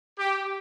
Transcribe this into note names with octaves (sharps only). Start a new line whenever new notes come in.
G4